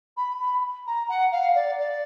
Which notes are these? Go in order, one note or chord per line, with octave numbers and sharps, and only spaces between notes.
B5
B5
A#5
F#5
F5
D5
D5